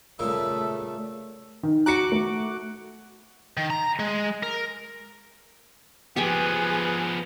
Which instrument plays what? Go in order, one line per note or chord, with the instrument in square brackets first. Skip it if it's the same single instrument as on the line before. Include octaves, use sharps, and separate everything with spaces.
[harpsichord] A#2 C#3 [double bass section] A3 [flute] E6
[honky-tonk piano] D#3
[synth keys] F#4 D6 F#6 [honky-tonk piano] A#5 C#7
[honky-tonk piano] A3
[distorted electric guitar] D#3
A#5
G#3
A#4
[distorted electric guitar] F3 B3 [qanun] G4 G5 G#5 [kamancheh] G#4 [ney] B4